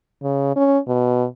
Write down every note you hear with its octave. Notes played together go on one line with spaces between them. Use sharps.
C#3
C#4
B2